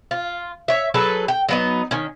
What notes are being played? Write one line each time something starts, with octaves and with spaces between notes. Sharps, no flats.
F4
C#5 E5
F#3 G#4 A4 B4
G5
F#3 B3 D#4
D#3 C#4